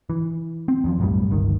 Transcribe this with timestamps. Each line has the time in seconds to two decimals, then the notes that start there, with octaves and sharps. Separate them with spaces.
0.10 E3
0.68 C4
0.84 E2 G2 F3
0.99 B1 F#2 A2 G3
1.30 G1 C#2 D#3